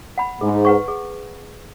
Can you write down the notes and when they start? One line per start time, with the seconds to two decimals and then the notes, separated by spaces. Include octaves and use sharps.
0.18 F#5 B5
0.41 G#2 G#4
0.65 B4 F#5 C#6
0.88 G#4